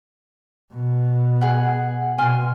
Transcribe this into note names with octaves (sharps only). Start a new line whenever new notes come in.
B2
G#4 F#5
B2 G#5 C6 F6